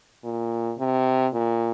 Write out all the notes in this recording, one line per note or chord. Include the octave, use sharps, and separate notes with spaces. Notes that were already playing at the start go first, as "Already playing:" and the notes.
A#2
C3
A#2